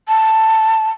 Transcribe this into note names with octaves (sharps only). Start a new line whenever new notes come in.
A5